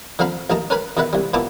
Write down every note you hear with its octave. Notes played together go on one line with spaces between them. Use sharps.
D3 F3 C4 F5 A#5 B5
A1 A#3 D#4 A5 A#5
C#4 A#4 B4 G#5 A#5 B5
E2 B2 D#3 B4 E5 F#5
C2 G3
A#2 B3 E4 A5 A#5 D6